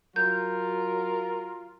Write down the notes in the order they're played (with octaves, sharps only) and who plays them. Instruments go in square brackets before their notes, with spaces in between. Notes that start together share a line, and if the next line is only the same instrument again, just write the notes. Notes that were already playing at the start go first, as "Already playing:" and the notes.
[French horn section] F#3 [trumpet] F4 [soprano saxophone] A#4 [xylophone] G6